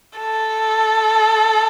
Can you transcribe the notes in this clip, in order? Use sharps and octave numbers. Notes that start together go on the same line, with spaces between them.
A4